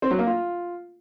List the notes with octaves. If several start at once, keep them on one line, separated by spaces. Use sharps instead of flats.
C4
F#3
A#3
F4